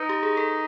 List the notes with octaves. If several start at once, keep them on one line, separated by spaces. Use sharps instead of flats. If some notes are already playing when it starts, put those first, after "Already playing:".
Already playing: D#4 B4
G4
G#4
A4